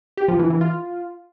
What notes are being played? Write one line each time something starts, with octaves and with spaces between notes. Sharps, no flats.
G4
F3
E3
E3
F4